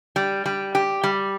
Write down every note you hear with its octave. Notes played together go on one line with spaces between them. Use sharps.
G3
G3
G4
G3